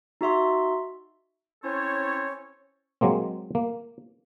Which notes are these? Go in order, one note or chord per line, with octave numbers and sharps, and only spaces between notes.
D#4 F#4 E5 C6
C4 C#4 E4 A4 C5 C#5
F#3 G#3 A#3 C4
A#3